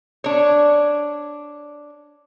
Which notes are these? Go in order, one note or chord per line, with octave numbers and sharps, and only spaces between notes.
D4 C#5